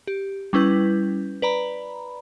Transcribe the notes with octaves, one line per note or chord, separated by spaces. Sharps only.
G4
G3 C#4 E4 B4 G6
B4 D5 A#5 B5